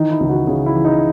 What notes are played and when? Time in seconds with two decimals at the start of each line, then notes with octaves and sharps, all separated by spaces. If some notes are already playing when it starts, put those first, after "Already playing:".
Already playing: D#3 E3 D#4
0.11 E4
0.20 C#2
0.29 F#4
0.47 C#3 G#4
0.66 E4
0.75 E3
0.85 D#4